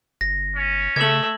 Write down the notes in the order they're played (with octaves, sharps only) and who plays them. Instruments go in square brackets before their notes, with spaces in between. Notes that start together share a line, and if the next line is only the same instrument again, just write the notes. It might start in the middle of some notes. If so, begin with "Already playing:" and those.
[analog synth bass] G1 [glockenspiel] A#6
[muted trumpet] C#4
[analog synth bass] C#3 [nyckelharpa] A3 E5 [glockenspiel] G#6 F#7